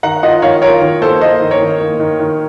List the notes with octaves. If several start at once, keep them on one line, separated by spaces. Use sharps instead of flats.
D#3 F#5 A#5
F4 D#5 F#5
D#3 C#5 F5
F4 A#4 C#5
D#3 A#4
A#3 A4 C5
A#3 C5 D#5
D#3
A#4 C#5
D#3
A#3
D#3
D#3